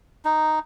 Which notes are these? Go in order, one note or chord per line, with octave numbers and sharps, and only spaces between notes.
D#4